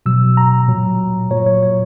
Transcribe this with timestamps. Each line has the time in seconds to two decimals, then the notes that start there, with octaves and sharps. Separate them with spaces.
0.06 B2 F#3 E6
0.37 A#5
0.68 A#2 F#3
1.31 A#2 F#3 C#5
1.46 C#5
1.63 C#5